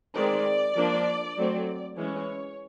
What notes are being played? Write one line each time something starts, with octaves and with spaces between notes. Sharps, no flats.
D#3 G#3 C4 D5
F3 A#3 D4
F#3 A3 C4
E3 G#3 C#4 C#5